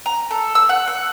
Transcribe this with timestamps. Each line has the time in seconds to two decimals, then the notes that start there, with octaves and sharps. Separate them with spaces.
0.06 A#5
0.31 A4
0.55 E6
0.69 F#5
0.88 F#5